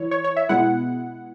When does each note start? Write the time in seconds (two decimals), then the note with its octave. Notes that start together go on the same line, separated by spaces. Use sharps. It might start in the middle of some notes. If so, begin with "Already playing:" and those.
Already playing: E3 E4 C#5
0.11 C#5
0.24 C#5
0.36 E5
0.49 B2 G#3 B3 E4 F#5